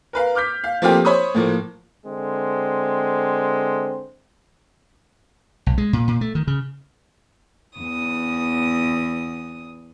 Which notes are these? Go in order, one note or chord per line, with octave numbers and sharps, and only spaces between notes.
A#4 B4 F5
D6 F6 G6 B6
F5
F3 A3 A#3 C4 F4 G4
C5 C#5 B5 C#6 D#6
A2 F3 A#3
D3 G#3 C4
B1
G#3
A#2
A#2
A3
D#3
C#3
E2 D#6